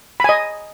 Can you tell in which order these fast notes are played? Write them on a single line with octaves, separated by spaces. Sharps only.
B5 G#5 D#5